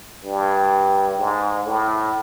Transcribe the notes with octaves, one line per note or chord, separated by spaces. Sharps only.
G2
G#2
A2